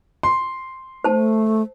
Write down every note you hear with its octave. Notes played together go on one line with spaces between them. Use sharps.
C6
A3 C5 A5